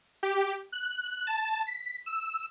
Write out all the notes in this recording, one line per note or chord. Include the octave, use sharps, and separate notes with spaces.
G4
F#6
A5
B6
E6